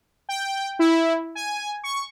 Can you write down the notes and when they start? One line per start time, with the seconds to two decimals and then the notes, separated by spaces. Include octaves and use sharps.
0.29 G5
0.79 E4
1.35 G#5
1.83 C#6